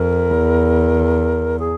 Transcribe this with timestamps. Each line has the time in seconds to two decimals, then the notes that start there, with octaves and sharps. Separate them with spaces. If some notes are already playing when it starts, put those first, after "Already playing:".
Already playing: F2 A#4
0.30 E2
1.59 G#4